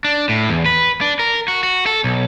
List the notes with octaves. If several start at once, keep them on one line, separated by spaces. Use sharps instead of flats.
D4
A2
E2
B4
D4
A#4
F#4
F#4
A4
B1